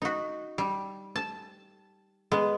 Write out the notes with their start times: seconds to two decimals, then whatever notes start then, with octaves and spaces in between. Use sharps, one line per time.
0.02 D#4 F#4
0.58 G3
1.16 A5
2.32 G#3 B3